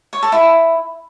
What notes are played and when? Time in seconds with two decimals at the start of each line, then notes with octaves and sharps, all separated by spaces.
0.13 C#5
0.22 A4
0.32 E4